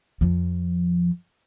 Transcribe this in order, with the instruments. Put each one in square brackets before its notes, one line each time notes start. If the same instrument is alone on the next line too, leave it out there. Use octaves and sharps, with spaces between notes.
[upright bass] F2 F3